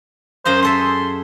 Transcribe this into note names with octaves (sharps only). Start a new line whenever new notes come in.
F#2 C5 D#5 F5
G#4 A4 E5 C6